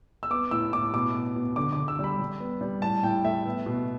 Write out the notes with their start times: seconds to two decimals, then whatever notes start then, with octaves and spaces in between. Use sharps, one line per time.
0.23 E6
0.30 B3 D6
0.51 A2 E6
0.73 A2 D6
0.93 B2 D6
1.15 B3
1.36 B2
1.56 D3 D6
1.72 D6
1.78 D3
1.88 E6
1.99 G3 B5
2.20 G3
2.40 B3
2.61 G3
2.82 A2 A5
3.03 A2 G5
3.24 A3 E5
3.46 B3
3.66 B2